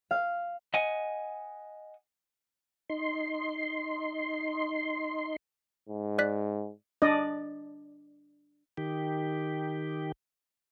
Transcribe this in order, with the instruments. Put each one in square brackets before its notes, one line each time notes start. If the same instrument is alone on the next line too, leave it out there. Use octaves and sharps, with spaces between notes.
[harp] F5
[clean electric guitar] D#5 F#5 G#5
[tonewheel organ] D#4 C6
[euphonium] G#2
[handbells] D5 F#6 B6
[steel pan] D4 D5 D#5
[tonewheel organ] D#3 G4